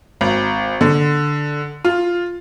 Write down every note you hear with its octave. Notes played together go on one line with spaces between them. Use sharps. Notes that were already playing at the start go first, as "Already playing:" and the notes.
G#1
D3
F4